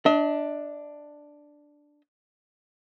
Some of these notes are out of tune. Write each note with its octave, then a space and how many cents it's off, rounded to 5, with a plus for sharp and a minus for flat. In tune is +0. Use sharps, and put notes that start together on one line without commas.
D4 +0 D#5 +45